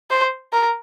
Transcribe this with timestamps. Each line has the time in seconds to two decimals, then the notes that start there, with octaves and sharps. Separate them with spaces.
0.10 C5
0.53 A#4